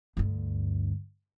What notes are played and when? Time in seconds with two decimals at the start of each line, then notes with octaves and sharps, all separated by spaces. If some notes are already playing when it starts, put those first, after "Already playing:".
0.17 D2 G2